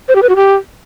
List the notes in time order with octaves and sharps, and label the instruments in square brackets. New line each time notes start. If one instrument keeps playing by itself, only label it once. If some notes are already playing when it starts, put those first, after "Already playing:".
[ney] C5
G4
B4
F#4
G4